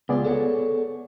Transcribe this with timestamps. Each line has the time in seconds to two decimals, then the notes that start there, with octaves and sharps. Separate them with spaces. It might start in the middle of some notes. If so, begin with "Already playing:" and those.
0.09 C#2 B3 F4 G#4 D5
0.25 A4 C#5 F#5